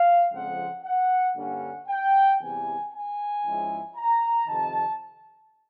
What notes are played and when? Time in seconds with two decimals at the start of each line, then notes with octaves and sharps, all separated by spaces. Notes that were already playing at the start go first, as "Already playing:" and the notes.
Already playing: F5
0.32 F2 C#3 F3 G#3 C4 F#5
0.84 F#5
1.35 G2 D3 G3 A#3 C#4 F#5
1.88 G5
2.39 E2 C3 E3 G3 G#5
2.91 G#5
3.43 G#2 F3 G#3 C#4 E4
3.96 A#5
4.47 F2 C3 D#3 A5